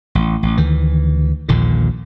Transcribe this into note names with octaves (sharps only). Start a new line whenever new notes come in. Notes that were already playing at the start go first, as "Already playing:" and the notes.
A1
A1
D2 D#3 E3
A#1 D#2 A#2 D3